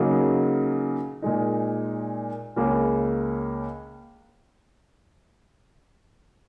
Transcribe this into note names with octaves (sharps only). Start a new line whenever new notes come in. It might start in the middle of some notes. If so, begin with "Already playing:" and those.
Already playing: C#3 F#3 A#3 D#4
A#2 G#3 D#4
C#2 C#3 A#3 C#4